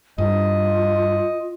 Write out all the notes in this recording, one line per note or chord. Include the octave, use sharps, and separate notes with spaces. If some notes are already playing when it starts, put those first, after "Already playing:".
G2 F4 D#5